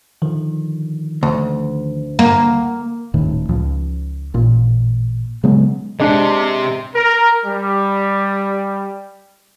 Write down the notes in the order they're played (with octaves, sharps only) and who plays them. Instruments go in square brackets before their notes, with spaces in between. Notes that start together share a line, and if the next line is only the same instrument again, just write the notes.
[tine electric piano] D3 D#3 F3
[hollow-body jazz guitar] D2
[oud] A#3 [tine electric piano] F#5
[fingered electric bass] D#1 A2 D#3
C#2 F3
A1 A#2
C#3 F#3 G#3 B3
[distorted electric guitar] C3 [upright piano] G#3 D4
[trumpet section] A#4
G3